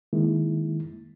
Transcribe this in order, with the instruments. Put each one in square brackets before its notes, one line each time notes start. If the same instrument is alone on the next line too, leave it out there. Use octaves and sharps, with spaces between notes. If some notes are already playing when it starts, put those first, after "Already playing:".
[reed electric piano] D#3 G#3 A#3 E4